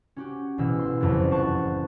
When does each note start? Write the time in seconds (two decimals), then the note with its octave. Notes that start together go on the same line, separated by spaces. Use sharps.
0.16 C#4 F#4 G4
0.58 A1 B2 E6 F6
0.79 C6
1.01 F#1 C2 F2 F#3 A5
1.31 C5 A5 C#6 F#6 A6